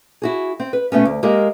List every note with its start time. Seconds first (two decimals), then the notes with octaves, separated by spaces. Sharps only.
0.22 E4 F#4 G#4
0.60 C4
0.73 B4
0.92 B2 A3 B3 C#4
1.05 D2
1.23 G#3 A#3 G4 A#4